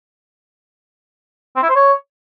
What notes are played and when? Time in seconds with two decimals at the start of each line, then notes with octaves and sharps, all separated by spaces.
1.56 C4
1.63 E4
1.69 C5
1.76 C#5